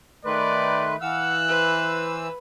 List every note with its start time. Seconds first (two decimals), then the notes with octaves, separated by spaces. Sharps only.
0.25 D#3 A3 B4 D5 C6
1.01 E3 F5 F#5 E6 F#6
1.48 B4 C5